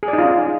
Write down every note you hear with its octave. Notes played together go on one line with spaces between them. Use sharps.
G#4
D5
D#4
F4
C#4